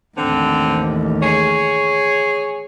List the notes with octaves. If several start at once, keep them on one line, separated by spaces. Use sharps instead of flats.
A1 D#2 D3 C4
G#4 C#5